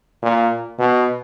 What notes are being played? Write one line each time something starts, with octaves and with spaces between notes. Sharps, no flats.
A#2
B2